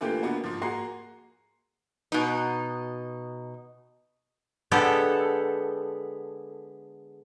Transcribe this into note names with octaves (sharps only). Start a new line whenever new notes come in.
D3 E3 A3 A#3 F4 G4
D3 A#3 B3 F#4
G#2 F3
A#3 F#4 G#4 A#5 C6 C7
B2 D#4
D3 G#3 B3 G4 A4